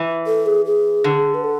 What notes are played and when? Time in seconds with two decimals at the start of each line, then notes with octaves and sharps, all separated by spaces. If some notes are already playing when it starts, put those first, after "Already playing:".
Already playing: E3
0.27 A4
0.46 G#4
0.66 G#4
1.04 D3
1.34 B4
1.44 A4